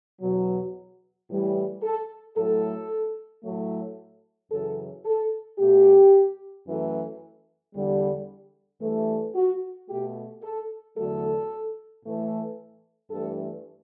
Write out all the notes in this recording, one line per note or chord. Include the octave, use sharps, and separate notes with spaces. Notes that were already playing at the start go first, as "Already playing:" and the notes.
E2 B2 F#3
A2 E3 G3
A4
A2 F#3 A3 A4
A2 F#3 A3
F#2 C#3 E3 A4
A4
B2 A3 G4
F#2 E3 A3
E2 D3 G3
G2 E3 A3
F#4
B2 A3 G4
A4
E2 D3 F#3 A3 A4
A2 E3 A3
G2 E3 A3 A4